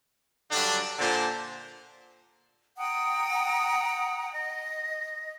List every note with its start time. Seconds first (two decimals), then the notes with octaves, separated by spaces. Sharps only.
0.52 G2 D3 F#3 D4
0.99 A#2 D3 C5 A5
2.78 F#5 G5 A#5 D#6
4.34 D#5